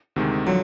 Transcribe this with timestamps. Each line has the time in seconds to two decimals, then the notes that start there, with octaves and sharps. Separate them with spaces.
0.16 D2 C3 D#3 G#3
0.47 D3 F3 F#3